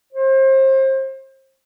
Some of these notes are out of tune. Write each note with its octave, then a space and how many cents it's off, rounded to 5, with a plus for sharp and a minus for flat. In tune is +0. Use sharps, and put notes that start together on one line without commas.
C5 +30